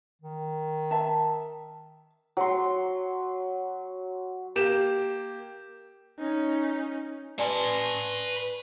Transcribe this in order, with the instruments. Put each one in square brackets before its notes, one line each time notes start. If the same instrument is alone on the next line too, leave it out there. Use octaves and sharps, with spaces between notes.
[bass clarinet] D#3
[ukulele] E5 A5
[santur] F#3 C6
[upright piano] A#3 G4 E7
[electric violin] C#4 D#4
[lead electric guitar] B4 A5 [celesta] D5 G#5 C6